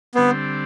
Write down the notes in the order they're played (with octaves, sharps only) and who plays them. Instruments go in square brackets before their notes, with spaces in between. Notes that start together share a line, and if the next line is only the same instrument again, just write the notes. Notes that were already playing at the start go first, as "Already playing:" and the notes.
[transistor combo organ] D3 G3 C4 [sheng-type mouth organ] B3